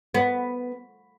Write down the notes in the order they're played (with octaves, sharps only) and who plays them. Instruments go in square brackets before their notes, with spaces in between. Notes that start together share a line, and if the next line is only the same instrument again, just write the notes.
[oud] B3